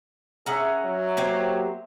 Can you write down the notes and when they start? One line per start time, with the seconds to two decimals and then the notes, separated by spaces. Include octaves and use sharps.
0.46 C#4 G#4 E5 F#5 A#5
0.85 F#3
1.17 A#3 G4 C5